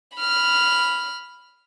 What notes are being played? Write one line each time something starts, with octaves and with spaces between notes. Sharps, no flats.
B5 F6